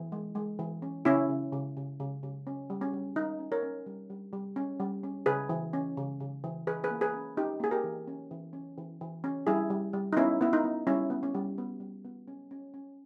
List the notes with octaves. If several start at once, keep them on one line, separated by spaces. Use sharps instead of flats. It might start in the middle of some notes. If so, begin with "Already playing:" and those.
Already playing: E3
G#3
G#3
E3
C#4
C#3 C#4 E4
C#3
C#3
C#3
C#3
C#3
C#4
G3
C#4
G3
G3 D#4
C#4
A#4 C#5
C#4
G3
G3
G3
C#4
G3
C#4
C#3 G#4 B4
E3
C#4
C#3
C#3
E3
E3 G#4 B4
G#4 B4
A#3
G#4 B4
C#4
C#4 D#4 G4
A#3 G#4
G4 A#4
E3
C#4
E3
C#4
E3
E3
C#4
G3 E4 G#4
G3
G3
D#4
B3 C#4 E4
B3 E4
D#4
B3
G3 C#4 E4
B3
C#4
G3
B3
G3
B3
C#4
C#4
C#4